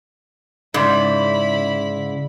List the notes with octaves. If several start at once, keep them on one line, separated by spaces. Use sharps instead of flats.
G#2 C#3 E4 D5 B5